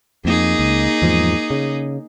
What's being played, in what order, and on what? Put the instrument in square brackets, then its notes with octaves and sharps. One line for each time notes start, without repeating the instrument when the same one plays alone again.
[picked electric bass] F2 [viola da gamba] A#3 D#4 G#4
[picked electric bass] C#2
E2 G#2 F3
C#3